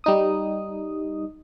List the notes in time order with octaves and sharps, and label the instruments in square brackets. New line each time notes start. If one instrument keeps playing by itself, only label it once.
[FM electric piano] G3 D#4 D#6